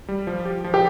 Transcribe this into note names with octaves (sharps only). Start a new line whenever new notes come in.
G3
F3
G4
F3
G4